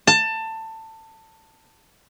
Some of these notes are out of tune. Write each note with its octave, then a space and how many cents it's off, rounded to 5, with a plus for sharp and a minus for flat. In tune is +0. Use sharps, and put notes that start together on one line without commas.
A5 +20